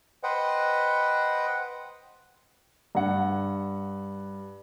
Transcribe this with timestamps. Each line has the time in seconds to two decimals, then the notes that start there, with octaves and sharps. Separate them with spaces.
0.23 B4 C5 D#5 F#5 G5
2.95 G2 F#5